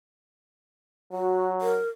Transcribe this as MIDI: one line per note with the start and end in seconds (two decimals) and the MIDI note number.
1.13 1.79 54
1.13 1.48 66
1.61 1.89 70